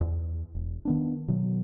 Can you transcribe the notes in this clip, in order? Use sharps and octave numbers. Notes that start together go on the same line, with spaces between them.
E2
E1
D#3 B3 D4
B2 D#3 F#3